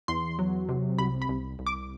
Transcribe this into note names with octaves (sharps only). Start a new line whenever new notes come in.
E2 C6
F#3
C3
C2 B5
B5
C2
C2
D6